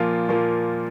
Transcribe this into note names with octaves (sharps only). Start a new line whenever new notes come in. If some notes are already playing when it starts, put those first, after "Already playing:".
Already playing: A#2 F3 A#3 F4
A#2 F3 A#3 F4